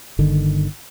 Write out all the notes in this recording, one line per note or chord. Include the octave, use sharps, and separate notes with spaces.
G1 D3 D#3